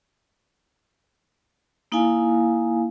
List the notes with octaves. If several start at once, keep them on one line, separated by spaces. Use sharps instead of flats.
A#3 D#4 E4 F5 G#5